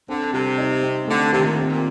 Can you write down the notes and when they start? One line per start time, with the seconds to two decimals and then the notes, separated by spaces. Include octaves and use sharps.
0.09 D3 C4
0.33 C3 G3
0.58 D#4
0.83 C4
1.08 D3 A3
1.32 C3 D#3
1.44 A#2
1.57 C4
1.71 A#2